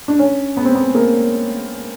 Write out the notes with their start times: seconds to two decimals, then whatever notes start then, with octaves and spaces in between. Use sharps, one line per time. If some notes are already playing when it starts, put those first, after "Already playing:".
0.08 D4
0.19 C#4
0.57 B3
0.65 C4
0.75 B3
0.95 A#3